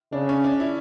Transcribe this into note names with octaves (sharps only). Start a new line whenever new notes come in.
C#3 D4
C#4
D4
E4